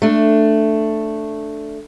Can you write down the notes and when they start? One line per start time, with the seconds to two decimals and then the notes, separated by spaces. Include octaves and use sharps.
0.02 A3 D4